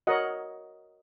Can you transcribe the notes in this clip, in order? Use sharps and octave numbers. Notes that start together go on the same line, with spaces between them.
F#4 A#4 C#5 D#5 F#5